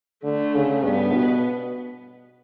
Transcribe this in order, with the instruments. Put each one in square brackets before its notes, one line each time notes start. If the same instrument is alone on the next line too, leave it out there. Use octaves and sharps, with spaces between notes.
[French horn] D3 [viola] A3
[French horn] C#3
[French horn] G2 [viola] B3
[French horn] B2